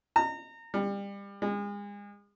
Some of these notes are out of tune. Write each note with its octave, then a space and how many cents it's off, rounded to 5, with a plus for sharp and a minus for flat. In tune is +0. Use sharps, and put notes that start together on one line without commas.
A#5 -30
G3 +30
G#3 -35